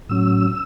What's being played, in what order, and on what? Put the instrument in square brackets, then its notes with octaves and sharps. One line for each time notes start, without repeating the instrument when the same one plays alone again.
[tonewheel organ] A2 F#3 C#4 E6